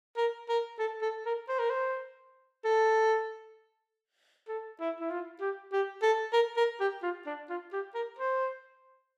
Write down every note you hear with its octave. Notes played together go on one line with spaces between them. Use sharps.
A#4
A#4
A4
A4
A#4
C5
A#4
C5
A4
A4
E4
E4
F4
G4
G4
A4
A#4
A#4
G4
F4
D4
F4
G4
A#4
C5